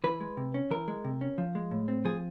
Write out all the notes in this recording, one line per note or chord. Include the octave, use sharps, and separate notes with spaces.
E3 B4
G#3
C3
C#4
E3 A#4
G#3
C3
C#4
F3
G#3
A2
C4
F3 G#4